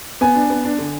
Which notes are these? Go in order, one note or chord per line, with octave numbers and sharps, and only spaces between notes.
B3 G#5
D4
B3
D4
D3